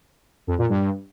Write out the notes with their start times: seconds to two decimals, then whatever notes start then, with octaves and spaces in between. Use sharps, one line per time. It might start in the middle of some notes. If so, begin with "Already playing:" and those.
0.47 F2
0.58 A#2
0.69 G2